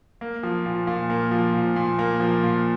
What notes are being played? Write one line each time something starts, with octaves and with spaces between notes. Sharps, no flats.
A#3
F3
A#2
A#2
A#3
F3
A#2
A#2
A#3
F3
A#2